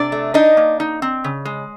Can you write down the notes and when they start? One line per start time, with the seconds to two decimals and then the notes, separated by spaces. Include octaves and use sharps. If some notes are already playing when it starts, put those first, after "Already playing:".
Already playing: C3 D4 D5
0.12 A3
0.34 D4 D#4 D#5
0.57 A#3
0.80 D#4
1.02 C4
1.24 C#3
1.45 G#3